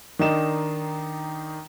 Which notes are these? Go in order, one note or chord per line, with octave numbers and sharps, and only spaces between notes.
D#3 D4 D#4 E7